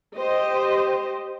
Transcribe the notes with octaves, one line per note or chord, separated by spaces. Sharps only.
G4 C5 D#5